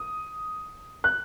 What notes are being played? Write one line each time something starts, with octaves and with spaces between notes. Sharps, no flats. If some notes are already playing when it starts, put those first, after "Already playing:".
Already playing: D#6
F#6